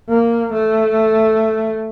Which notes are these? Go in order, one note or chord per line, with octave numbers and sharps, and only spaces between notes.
A#3
A3